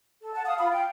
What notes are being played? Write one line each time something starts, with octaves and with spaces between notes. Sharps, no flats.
A4
F#5 A5
F5 D#6
F4 B5
F5 G5